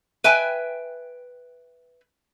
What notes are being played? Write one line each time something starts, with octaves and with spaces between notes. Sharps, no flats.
B4 E5 G5 G#5